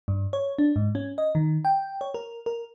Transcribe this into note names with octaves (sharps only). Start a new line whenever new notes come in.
G2
C#5
D4
G#2
C#4
D#5
D#3
G5
C#5
A#4
A#4